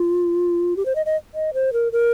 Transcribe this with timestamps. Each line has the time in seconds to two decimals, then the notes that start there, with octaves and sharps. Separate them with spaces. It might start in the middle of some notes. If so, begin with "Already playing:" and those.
Already playing: F4
0.77 G4
0.86 C5
0.95 D#5
1.06 D#5
1.34 D#5
1.54 C5
1.73 A#4
1.92 A#4